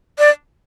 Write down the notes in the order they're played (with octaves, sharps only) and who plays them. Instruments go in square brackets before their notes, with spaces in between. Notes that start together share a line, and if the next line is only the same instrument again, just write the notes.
[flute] D5